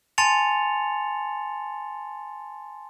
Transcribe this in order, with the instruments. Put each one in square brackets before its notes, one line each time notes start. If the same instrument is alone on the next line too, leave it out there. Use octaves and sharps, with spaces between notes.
[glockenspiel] G#5 A5 C6 A6 C#7 F7